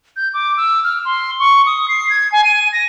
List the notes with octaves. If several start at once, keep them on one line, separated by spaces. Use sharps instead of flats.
G6
D6
E6
F6
C6
C#6
D#6
C7
G#6
G#5
D#7
A#6